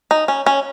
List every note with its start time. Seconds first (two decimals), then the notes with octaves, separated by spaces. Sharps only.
0.11 D#4
0.28 C#4
0.46 C#4